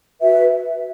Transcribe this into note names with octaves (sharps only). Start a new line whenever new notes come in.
F#4 B4 E5